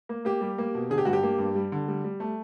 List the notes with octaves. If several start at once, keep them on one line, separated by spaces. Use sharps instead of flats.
A#3
A#3 G4
G3
A#3
B2
D3 G#4
G4
G2 F#4
G4
A#3
G2
G3
D3
G3
G3
A3